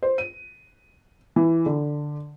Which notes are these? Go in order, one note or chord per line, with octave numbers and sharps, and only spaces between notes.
C5
D#7
E3
D3